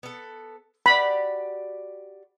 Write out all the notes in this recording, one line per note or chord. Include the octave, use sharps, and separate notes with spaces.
B3 A4
F#4 G4 D5 B5